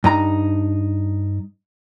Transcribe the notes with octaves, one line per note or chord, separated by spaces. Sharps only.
G2 D#4 A#5